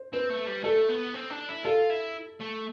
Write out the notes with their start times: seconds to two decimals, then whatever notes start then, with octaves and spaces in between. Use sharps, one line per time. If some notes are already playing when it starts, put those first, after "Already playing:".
Already playing: C5
0.13 C4 B4
0.30 A3
0.47 G3
0.64 A3 A4
0.89 B3
1.14 C4
1.30 D4
1.48 E4
1.64 F4 A4
1.90 E4
2.40 A3